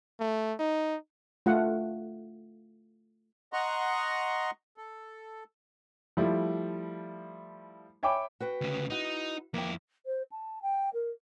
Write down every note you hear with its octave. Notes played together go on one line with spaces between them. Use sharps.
A3
D#4
A3 F4 F#5
D#5 F#5 A#5 C6 C#6
A4
F3 G3 A3 E4
C#5 E5 G5 G#5 B5 D6
F#4 B4 G5
D2 C#3
D#4 E4 F#4
F2 A#3 E4 G5
C5
A5
G5
A#4